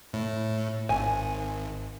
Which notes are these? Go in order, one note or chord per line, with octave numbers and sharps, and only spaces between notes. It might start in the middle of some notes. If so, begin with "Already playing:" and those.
A2
G#1 G#5